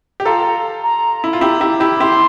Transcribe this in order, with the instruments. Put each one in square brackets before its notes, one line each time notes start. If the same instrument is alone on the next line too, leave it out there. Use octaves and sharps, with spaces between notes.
[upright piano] G4
[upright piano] F4 A4 [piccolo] A#5
[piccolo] A#5
[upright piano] E4
F4
[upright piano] E4 G4 [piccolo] A#5
[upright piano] E4 G4
E4 G4
[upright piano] E4 G4 [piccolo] C6